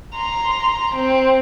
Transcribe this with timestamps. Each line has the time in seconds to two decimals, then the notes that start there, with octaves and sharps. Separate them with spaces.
0.15 A#5 C6
0.95 C4